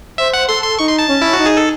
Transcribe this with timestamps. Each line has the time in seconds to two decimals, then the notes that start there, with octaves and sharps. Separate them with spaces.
0.18 C5 E5
0.33 F#5
0.48 A4 C6
0.64 C6
0.79 D#4 C#6
0.88 C6
0.99 A5
1.09 C#4
1.22 E4
1.33 D#4 F#4
1.46 G#4
1.57 A4